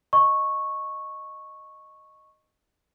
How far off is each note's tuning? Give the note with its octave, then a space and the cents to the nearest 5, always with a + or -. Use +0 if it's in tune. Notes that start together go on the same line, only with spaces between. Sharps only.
D#5 -10 C#6 -10